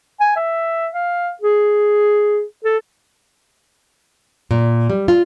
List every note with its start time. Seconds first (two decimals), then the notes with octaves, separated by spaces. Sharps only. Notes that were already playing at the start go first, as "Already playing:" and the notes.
0.20 G#5
0.36 E5
0.93 F5
1.41 G#4
2.64 A4
4.51 A#2
4.90 G3
5.08 F4